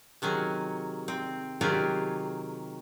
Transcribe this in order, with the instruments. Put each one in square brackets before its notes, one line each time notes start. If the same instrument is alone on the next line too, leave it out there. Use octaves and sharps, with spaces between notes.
[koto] C3 D#3 F#3 G#4
C4
C3 D#3 F#3 F4 G4 G#4